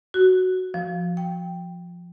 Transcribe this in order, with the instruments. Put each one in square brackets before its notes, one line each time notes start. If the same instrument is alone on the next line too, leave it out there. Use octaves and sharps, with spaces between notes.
[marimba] F#4
F3
G5